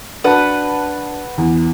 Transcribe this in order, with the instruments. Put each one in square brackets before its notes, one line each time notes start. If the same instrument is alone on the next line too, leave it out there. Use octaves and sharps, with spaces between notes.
[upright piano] D4 F#4 A5 [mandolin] B4 F#5
[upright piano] E2